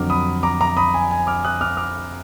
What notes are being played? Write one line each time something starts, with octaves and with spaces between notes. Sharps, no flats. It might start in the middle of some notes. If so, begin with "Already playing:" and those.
Already playing: F2 D3 F#3 D6 F6
B5 D#6
A#5 D6
A#5 D6
B5 D#6
G#5
G#5
D6 F6
D#6 F#6
D6 F6
D6 F6